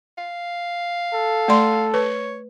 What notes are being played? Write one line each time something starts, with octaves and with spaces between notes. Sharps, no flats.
F5
A4
A3 D5 C6
B4 C#5